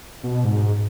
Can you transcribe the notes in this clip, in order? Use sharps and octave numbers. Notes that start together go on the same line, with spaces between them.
B2
G#2